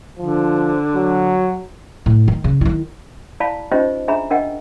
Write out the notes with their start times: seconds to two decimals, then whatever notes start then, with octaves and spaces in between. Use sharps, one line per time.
0.19 D3 F3
0.95 F#3
2.06 A2
2.28 D#3
2.44 C#3
2.61 D#3 E4
3.40 E4 D5 F5 A5 B5
3.72 C#4 D#4 F4 G4 C5 D#5
4.08 D4 G#4 E5 A#5 B5
4.30 D4 A#4 D#5 F#5 G5